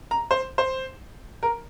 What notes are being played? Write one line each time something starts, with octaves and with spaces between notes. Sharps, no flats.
A#5
C5
C5
A#4